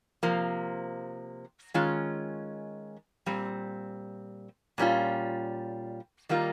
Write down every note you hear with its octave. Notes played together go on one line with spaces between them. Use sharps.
C3 F3 A#3
D#3 G#3 C#4 F4
A#2 G3 C4
A#2 G3 C#4 F4
D#3 G3 A#3 F4